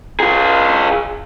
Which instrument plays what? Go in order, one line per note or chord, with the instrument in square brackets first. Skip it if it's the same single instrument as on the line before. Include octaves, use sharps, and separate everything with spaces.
[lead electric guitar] F4 G#4